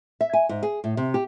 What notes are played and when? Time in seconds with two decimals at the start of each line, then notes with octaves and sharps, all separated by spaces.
0.21 E5
0.33 G#5
0.49 G#2
0.63 G#4
0.84 A2
0.97 C3
1.14 G4